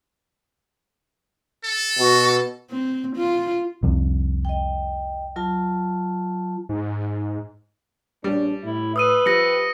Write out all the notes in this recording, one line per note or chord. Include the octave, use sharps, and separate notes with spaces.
A4
B2 F#4
C4
F4
C2 F2
D#5 G5
F#3 F4 A5
G#2
A#1 G2 G3 C#4 D4
A2 E4
B4 D#6 E6 D#7
F3 G4 E6 A#6 C#7